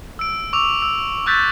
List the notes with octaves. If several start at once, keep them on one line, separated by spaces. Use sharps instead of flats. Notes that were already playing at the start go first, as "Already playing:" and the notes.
E6 D7
C#6 D6 E6 F7
E6
C#6 E6 F#6 G6 A6 B6